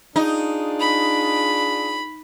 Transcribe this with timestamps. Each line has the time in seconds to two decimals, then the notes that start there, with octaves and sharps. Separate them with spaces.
0.16 D4 D#4 F4 G#4
0.80 B5